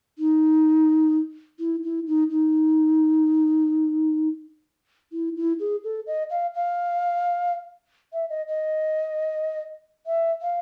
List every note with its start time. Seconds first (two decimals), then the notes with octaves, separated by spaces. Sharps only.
0.19 D#4
1.60 E4
1.84 E4
2.07 D#4
2.31 D#4
5.13 E4
5.37 E4
5.60 G#4
5.84 A4
6.07 D#5
6.30 F5
6.54 F5
8.13 E5
8.30 D#5
8.48 D#5
10.07 E5
10.42 F5